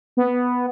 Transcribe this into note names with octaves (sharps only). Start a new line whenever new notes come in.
B3